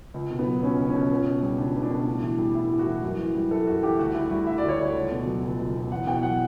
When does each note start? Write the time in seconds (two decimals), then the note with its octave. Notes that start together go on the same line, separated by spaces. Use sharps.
0.14 C#2
0.30 B2
0.39 B3
0.46 F#3
0.62 C#2 C#4
0.79 C#2
0.87 C#4
0.94 B2
1.11 C#2
1.26 B2
1.43 G3
1.58 C#2 D4
1.75 C#2
1.83 D4
1.90 B2
2.06 A2
2.22 E3
2.39 G3
2.55 A2 E4
2.70 A2
2.79 F#4
2.86 E3
3.03 F#2
3.19 E3
3.35 G3
3.51 F#2 A4
3.67 F#2 F#4
3.83 E3 G4
3.98 D2 F#4
4.15 D3 E4
4.31 G3 F#4
4.47 D2 E5
4.58 D5
4.63 D2
4.68 C#5
4.79 D3 D5
4.95 C#2
5.11 B2
5.27 F#3
5.43 C#2
5.59 C#2
5.75 B2
5.91 E2 F#5
6.07 B2 G5
6.23 F#3 F#5